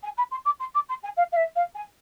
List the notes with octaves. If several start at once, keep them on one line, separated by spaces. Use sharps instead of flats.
G#5
B5
C6
D6
C6
D6
C6
G#5
F5
F5
E5
F5
G#5